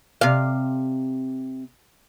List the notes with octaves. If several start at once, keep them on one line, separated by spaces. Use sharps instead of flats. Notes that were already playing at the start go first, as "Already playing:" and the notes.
C3 F5